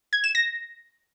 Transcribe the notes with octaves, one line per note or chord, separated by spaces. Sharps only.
G#6
E7
A#6